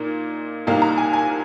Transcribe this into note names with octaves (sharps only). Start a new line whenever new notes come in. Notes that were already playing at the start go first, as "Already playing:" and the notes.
Already playing: A#2 A#3 D#4
C2 A#2 A#3 D#4 F5
A#5
G#5
G#5